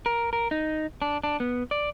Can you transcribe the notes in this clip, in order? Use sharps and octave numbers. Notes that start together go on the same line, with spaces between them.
A#4
A#4
D#4
D4
D4
B3
D5